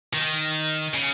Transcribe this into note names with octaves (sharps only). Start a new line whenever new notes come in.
D#3
C#3